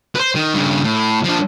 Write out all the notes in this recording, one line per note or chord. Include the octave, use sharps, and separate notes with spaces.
B4 C5
D#3
G2 C#3
A2
F3 D4